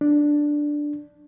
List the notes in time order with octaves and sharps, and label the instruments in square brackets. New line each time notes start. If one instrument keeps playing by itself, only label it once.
[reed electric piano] D4